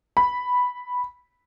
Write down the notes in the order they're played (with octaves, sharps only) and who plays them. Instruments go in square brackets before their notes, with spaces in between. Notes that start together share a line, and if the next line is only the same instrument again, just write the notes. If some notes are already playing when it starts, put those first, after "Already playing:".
[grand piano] B5